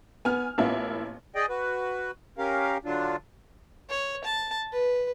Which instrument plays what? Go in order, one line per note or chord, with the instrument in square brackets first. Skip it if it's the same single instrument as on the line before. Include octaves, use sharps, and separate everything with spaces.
[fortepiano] B3 [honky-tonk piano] G#5 F6
[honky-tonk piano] A1 A#3 E4 [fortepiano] B3 C#4 F4
[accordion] G#4 D5 D#5 G5
F#4 B4
C#4 G4 A#4 F5
D3 F#3 D4 F4
[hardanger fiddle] C#5
A5
B4